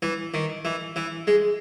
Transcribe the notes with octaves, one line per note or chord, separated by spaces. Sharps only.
E3
D#3
E3
E3
G#3